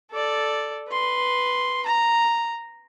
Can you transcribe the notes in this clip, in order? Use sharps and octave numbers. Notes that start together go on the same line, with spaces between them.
A4 D5
B4 C6
A#5